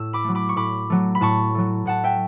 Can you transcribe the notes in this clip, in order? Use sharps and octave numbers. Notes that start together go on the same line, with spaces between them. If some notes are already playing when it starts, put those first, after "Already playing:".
Already playing: A2 E6
B5 D6
F#3 A3
B5 D6
C#6
A2 B5 D6
F#3 A3
B5
A2 A5 C#6
F#3 A3
A2 F#5 A5
E5 G5